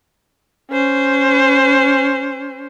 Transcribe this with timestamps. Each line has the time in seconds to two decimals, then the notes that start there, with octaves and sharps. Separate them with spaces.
0.71 C#4 C5